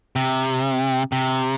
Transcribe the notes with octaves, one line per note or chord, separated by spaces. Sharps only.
C3
C3